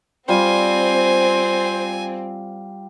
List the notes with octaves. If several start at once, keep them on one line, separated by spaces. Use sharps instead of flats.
G3 C4 F4 C5 G#5